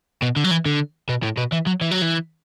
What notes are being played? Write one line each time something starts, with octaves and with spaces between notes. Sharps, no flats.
B2
D3
F#3
E3
D3
B2
A2
B2
E3
F#3
E3
F#3
E3